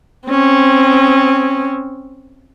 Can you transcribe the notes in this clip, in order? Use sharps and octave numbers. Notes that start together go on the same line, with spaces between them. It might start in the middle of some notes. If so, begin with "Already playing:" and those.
C4 C#4